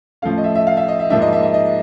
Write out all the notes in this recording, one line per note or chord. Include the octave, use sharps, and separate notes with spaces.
A2 F3 A3 C#4 F5
D#5
E5
E5
F5
E5
D#5
E5
G#2 F3 A#3 D4 E5
D#5
E5
E5
D#5